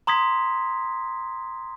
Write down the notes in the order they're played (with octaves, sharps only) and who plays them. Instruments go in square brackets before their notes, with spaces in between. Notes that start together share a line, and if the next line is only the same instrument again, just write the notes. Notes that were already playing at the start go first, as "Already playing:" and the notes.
[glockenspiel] A#5 C6 D#6 G#6 B6